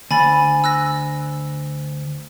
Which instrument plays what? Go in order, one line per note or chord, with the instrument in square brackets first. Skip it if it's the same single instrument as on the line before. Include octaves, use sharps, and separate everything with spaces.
[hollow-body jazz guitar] D2 [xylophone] G#5 B5 A6
[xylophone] E6 F#6 A#6